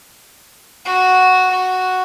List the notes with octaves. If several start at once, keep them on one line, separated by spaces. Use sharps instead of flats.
F#4
F#4